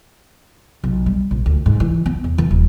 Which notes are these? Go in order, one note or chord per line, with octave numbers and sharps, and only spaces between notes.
B1
G3
A#1
D2
G#2
E3
B3
E2
E3
D#1